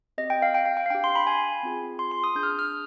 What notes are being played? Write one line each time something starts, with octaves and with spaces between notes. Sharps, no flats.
C4 G4 D#5
G5
F5
G5
F5
G5
F5
D4 G4 G5
C6
B5
G#5
C4 F4 G#4
C6
C6
D#6
D4 G#4 G6
F6
D#6
F6